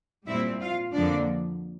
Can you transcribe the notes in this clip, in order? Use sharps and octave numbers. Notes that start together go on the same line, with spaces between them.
A#2 G3 C4 E4 E5
F4 F5
F2 D3 F3 A#3 D4 D5